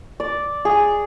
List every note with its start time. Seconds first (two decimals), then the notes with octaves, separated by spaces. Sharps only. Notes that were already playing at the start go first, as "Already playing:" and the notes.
0.20 D5
0.65 G#4